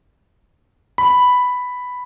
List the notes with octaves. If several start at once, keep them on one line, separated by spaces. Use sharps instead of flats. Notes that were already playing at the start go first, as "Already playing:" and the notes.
B5